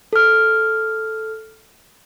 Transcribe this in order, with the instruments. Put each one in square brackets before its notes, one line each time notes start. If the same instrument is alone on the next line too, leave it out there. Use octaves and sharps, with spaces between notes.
[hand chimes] A4 F6